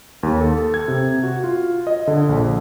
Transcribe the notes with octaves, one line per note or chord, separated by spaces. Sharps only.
D#2
A4
G#6
C3
F#4
F4
D#5
D3
A#1